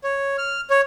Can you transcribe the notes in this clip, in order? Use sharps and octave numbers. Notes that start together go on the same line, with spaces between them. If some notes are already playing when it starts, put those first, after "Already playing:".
C#5
F6
C#5